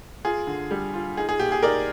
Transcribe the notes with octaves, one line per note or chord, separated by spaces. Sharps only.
F4 G#4
D3
G3
F4
D#4 G#4
G#4
A#2 G4
G#4
D#4 A#4 D5